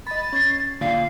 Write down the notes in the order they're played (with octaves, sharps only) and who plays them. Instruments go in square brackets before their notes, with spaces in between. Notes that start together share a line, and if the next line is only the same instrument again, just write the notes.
[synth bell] D#5 B5 [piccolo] A6
[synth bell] C#4 G#6 C7
[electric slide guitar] A#2 [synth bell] D3 [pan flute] F5